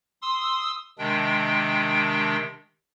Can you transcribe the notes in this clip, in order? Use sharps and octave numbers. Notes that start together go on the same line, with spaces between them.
C6 D#6 E6
C3 D#3 G#3 D4 G5